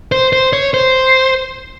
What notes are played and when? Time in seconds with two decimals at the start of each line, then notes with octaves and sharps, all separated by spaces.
0.12 C5
0.33 C5
0.53 C#5
0.74 C5